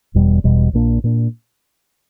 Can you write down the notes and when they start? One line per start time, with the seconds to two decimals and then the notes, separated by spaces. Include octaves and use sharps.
0.14 E1 E2 B2 G3
0.44 E1 E2 B2 G3
0.73 A#1 A#2 A#3 D4
1.04 A#2 A#3 D4